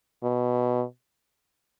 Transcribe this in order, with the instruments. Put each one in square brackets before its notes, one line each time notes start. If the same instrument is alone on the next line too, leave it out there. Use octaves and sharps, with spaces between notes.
[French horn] B2